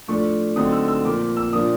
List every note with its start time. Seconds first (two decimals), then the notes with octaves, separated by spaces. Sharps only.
0.08 A2 F3 A3 D4 C#6
0.56 D3 F#3 A3 C4 D#4 D#6
0.72 E6
0.88 E6
1.04 A#2 F3 A#3 D6
1.37 E6
1.52 A#2 F3 A#3 D4 D#6